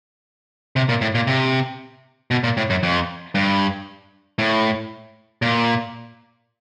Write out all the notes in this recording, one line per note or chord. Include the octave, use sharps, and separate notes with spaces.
C3
A#2
A2
A#2
C3
B2
A#2
A2
F#2
F2
G2
A2
A#2